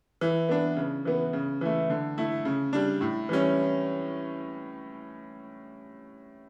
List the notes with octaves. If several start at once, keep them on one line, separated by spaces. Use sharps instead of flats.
E3
B3 D4
C#3
E3 B3
C#3
E3 A3
D3
A3 E4
C#3
G3 D4
A2
E3 G3 C#4